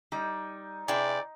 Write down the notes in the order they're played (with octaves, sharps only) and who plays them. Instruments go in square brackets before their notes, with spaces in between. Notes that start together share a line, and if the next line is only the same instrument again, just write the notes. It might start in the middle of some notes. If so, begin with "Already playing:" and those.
[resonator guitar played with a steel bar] G3 [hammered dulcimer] D#4
[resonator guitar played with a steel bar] C3 E4 [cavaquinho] G#4 G5 [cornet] D5